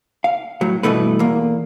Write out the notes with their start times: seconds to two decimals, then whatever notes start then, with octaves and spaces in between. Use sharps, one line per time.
0.24 F5
0.61 A2 F#3
0.83 G2 B2 E3 A3 B4
1.19 E2 A#3